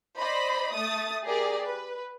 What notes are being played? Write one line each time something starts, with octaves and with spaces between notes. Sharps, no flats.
C5 D5 D#5 B5
A3 D#6 A6
G4 G#4 A#4 D5
B4